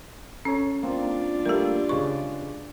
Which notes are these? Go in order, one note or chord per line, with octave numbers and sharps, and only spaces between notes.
C#4 A4 C#5
A#3 C4 D4 F4
G3 A3 A#3 G4 A#4
C#3 G#3 B4 C#6